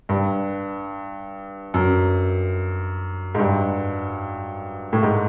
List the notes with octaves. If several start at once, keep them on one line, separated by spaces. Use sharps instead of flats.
G2
F#2
G#2
G2
A2
G#2